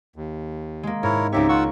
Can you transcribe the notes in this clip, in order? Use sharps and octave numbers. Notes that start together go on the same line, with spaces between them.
D#2
G#3 A#3
G#2 E4 A#4 C#5
C#2 A#3 C4 D#4 G4 C#5 E5
F4 F#5 C#6 E6